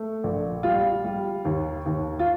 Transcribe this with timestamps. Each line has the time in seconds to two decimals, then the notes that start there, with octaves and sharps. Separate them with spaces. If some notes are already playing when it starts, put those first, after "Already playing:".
Already playing: A3
0.24 A#1
0.63 G3 F4
1.05 G3
1.45 D#2
1.86 D#2
2.19 F4